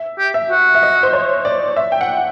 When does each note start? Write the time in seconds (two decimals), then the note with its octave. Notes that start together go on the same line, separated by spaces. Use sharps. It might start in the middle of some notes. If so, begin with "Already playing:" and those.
Already playing: E5
0.19 G4
0.34 E5
0.50 F#4
0.75 E5
0.83 D#5
1.03 C5
1.13 C#5
1.45 D5
1.76 E5
1.92 G5
2.01 F#5